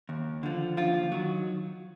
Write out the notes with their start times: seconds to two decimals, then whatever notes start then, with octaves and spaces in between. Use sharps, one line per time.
0.09 D#2
0.43 D3 F3
0.77 D#2 F3 F4
1.12 D#3 F#3